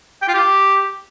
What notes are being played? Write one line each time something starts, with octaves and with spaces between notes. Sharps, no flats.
G5
F4
G4